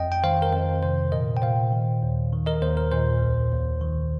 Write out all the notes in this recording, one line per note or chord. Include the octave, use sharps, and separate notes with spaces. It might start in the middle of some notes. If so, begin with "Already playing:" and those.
Already playing: F2 D#5 G5
G5
D#3 C5 F5
A#4
F2 C5
C3 C5
A#2 A#4 D#5
G5
A#2 C5 F5
D#3
D#2
D#3
A#4 D#5
D#2 C5
A#4
A#2 C5
C2
D#2
D#3